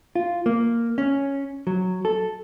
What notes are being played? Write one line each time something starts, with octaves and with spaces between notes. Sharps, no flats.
F4
A#3
C#4
F#3
A4